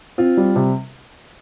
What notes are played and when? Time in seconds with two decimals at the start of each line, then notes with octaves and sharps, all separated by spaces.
0.18 C4 F4
0.37 G3
0.56 C3